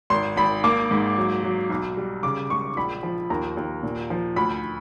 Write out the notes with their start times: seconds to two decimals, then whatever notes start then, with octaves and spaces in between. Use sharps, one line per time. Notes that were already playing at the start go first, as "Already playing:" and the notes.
0.10 G#1 C6
0.37 G#1 B5
0.64 A#3 D6
0.91 G#2
1.18 F#3
1.43 F#3
1.70 B1
1.97 G3
2.23 C#3 D6
2.50 G#3 C#6
2.77 A#1 B5
3.03 F3
3.30 D#2 A#5
3.57 D#2
3.83 A#2
4.10 F3
4.36 D2 B5